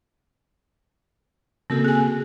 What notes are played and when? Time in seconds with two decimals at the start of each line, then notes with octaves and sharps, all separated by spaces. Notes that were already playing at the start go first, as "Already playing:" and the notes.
1.70 C#3 A#3 C4 F#4 A4
1.84 G#4 G#5